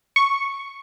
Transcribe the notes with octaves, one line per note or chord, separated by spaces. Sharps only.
C#6